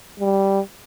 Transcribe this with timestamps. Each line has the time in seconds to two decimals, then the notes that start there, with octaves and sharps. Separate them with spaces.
0.20 G3